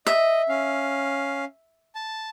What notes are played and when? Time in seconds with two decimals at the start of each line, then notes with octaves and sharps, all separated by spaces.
0.07 D#5 E5
0.49 C#4 F5
1.95 A5